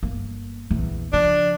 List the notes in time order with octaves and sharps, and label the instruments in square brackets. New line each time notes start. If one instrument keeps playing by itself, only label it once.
[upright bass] G1 A#3
A#1 E2
[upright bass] C#3 F3 [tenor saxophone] D4